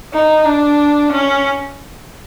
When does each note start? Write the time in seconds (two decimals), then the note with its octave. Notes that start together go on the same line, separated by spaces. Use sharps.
0.13 D#4
0.46 D4
1.12 C#4